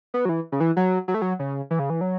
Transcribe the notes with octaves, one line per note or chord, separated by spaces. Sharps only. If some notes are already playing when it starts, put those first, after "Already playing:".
B3
F#3
E3
C#3
E3
F#3
F#3
A3
F#3
C#3
E3
C#3
E3
F#3